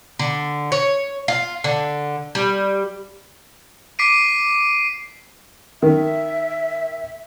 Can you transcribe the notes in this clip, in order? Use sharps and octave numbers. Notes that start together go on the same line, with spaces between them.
D3
C#5
F4
D3
G3
D6 B6 C7 D7 D#7
D#3 E5